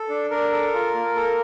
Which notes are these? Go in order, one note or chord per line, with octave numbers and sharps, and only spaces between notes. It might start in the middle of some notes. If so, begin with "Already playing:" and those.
Already playing: A4
D4
D4 A#4
A4
F4
A#3
A4